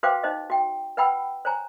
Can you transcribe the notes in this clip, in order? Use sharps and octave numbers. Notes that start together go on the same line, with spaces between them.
F#4 B4 C5 F5 G5 D6
D#4 C5 D#5
F#4 G5
B4 F#5 G5 B5 E6
C5 C#5 G#5 A#5